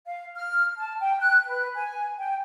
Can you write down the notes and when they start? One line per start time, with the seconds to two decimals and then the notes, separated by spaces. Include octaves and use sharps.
0.06 F5
0.35 F6
0.77 A5
1.00 G5
1.18 F#6
1.47 B4
1.74 G#5
2.17 G5